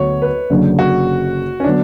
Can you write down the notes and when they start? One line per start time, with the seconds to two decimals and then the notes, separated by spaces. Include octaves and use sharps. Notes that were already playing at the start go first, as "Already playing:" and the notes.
Already playing: D2 F#3 B3 C#5
0.22 B4
0.50 F#1 F#2 D3 F#3
0.79 F#4
1.60 C#4
1.64 D3 F#3 B3 D4